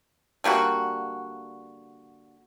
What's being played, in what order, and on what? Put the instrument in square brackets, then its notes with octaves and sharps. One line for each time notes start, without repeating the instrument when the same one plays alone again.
[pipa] D3 G3 A#3 F#4